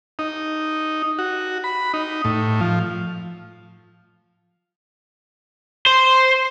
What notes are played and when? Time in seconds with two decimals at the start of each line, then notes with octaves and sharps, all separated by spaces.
0.19 D#4
1.19 F#4
1.64 B5
1.94 D#4
2.25 A2
2.60 F3
5.86 C5